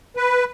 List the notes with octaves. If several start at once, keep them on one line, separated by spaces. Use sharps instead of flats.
B4